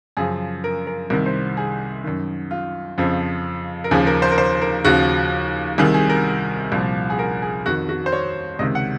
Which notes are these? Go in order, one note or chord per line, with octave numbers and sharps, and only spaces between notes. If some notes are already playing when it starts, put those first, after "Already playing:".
F#2 C#3 F3 G#4
A#4
A#4
C2 C3 D#3 A#4
C5
G#4
F#2 D#3
F4
F2 C#3 F3
A#4
D#2 C#3 F3 G#4
A#4
C5
A#4
C5
A#4
D#2 C#3 F3 F#4
C2 C3 D#3 G#4
G#4
A#4
C2 A#2 F3
G#4
A#4
G#4
F2 D#3 F#4
F#4
C5
C#5
C#2 C3 D#3 D#5
F#5